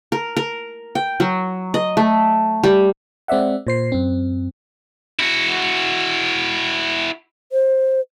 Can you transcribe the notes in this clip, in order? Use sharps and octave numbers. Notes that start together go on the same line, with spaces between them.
A#4
A#4
G5
F#3
D#5
A3
G3
G#3 C4 D5 E5 F#5
A#2 C5 C7
F#2 C4
E4 F#4
C5